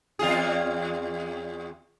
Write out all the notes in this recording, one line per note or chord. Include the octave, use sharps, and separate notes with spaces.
E2 F4 G#4